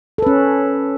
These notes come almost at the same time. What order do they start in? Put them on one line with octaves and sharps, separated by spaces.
A4 B4 C#4